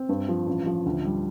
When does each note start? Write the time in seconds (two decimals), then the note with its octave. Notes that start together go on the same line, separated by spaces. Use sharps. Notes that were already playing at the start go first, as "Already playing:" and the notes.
Already playing: C4
0.09 G2
0.28 F3
0.47 A1
0.66 F3
0.86 D2
1.05 G3